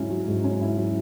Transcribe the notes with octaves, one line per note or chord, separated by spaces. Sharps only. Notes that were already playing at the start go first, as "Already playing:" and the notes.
Already playing: G#2 F#3 C#4 E4
F#3
G#2
C#4
E4
F#3